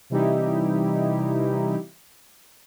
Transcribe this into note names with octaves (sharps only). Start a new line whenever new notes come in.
C3 E3 G3 D#4 E4 G4